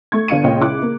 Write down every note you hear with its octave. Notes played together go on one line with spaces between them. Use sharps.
A3 C#6 G#6
G1 D4 F5 C#7 D#7
C#2 A#2 C#5 D#5 G5
C#2 E4 D6 F#6
A#3